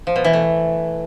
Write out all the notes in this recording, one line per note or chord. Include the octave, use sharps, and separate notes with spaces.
F3
B2
E3
A3